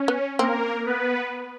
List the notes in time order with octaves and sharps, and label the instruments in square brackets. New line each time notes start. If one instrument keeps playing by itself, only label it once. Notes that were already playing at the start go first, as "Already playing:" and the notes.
Already playing: [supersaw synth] C#4
[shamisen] B3
[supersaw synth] A#3 A#4 [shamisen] C4
[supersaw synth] B3 B4